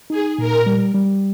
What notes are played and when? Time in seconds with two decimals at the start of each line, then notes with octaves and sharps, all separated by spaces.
0.10 D#4 G#4
0.38 A#2 A#4
0.66 G3
0.95 G3